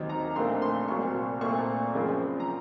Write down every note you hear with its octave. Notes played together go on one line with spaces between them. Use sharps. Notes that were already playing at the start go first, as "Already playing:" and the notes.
Already playing: D#2 D#3 F#3 C4
A#5
A#1 A#2 A3 C4 C6
C6
C2 A#2 F#3 C4 C#6
A#2 A3 C4 C#6
F#2 C#3 F3 C4
A#5